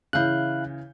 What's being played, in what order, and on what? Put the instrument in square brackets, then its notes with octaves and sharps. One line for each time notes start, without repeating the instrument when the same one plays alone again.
[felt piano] C#3 E3 G6 [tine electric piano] E4 F5 F#6